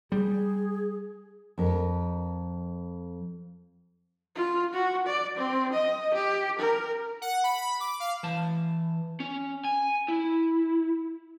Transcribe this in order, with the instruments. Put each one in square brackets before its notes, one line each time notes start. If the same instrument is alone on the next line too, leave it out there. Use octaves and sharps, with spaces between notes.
[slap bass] G3 [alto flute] G#4
[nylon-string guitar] F2 A#4
[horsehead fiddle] F4
F#4
D5
C4
D#5
G4
A#4
[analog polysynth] F#5
B5
D6
F5
[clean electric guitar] E3 A5
[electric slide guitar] C#4
G#5
E4